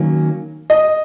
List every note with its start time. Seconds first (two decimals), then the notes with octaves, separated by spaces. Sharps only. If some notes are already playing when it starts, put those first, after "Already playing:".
Already playing: D#3 F#3 A#3 C#4
0.70 D#5